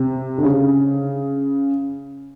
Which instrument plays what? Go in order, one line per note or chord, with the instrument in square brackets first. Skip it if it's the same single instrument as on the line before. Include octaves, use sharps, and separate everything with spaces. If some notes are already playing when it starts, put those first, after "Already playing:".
Already playing: [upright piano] C3
D3
C#3